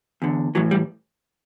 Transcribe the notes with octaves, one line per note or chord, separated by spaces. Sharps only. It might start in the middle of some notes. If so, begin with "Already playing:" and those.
E2 D3
A2 E3 F#3
G3